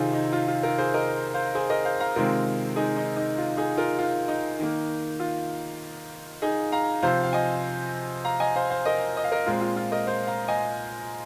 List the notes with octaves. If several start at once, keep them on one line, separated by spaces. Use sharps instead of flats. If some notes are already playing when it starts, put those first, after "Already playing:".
Already playing: C3 D#3 C4 D#4 F4 G#4
D#4
F4
F4
F4 A#4
G#4 C5
A#4 D#5
C5 F5
G#4 C5
A#4 D#5
C5 F5
F5 A#5
C3 D#3 G#3 C4 F4 A#4
D#4 G#4
D#4
D#4
F4
D#4 G#4
F4 A#4
F4
D#4
D#3 A#3
F4
D#4 G#4
F5 A#5
C3 F3 C4 C5 F5
F5
D#5 G#5
F5 A#5
D#5 G#5
C5 F5
C5 F5
A#4 D#5
D#5
F5
A#4 D#5
A#2 G#3 C4 F4
F4
F4
A#4 D#5
C5 F5
F5 A#5
D#5 G#5